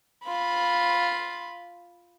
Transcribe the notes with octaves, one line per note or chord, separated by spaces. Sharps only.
F4 B5